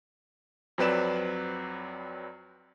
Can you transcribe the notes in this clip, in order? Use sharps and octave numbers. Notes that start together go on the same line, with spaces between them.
F2 F#3 C4 B4 D5 E7